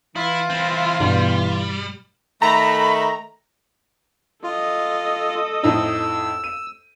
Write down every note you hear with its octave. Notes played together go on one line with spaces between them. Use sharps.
E3 E4 F4
C4 E4
G2 B2 G3
D#3 A3 A#5 B5
F4 A4 D#5
F2 A2 D#4 E6
D#7